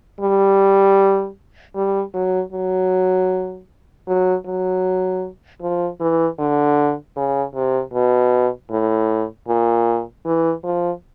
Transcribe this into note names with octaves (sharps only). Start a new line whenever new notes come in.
G3
G3
F#3
F#3
F#3
F#3
F3
E3
D3
C#3
C3
B2
A2
A#2
E3
F3